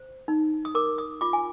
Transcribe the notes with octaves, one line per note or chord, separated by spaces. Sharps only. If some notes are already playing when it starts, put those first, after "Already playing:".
Already playing: C5
D#4
D#6
A#4 D6
D#6
F4 D6
G#5